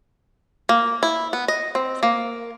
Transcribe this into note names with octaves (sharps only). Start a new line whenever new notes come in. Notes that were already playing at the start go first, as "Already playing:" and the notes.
A#3
E4
B3
D#5
C4
A#3